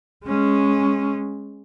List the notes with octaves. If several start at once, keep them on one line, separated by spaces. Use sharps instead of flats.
G#3 C#4